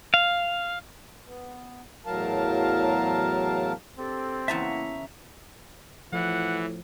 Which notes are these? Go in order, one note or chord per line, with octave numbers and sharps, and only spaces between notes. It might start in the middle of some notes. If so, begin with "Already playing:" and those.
F5
B3
E2 A2 F#3 A#4 F5 A5
C4 D4 G4 A4
E2 C#3 A#3 E4 E5 A5 A#5 C#6
A2 E3 F3 F#5